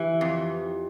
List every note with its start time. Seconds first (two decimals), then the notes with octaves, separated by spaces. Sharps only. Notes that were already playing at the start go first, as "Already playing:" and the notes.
Already playing: E3 G4
0.21 F2